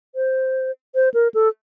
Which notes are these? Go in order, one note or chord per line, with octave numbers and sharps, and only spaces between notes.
C5
C5
A#4
A4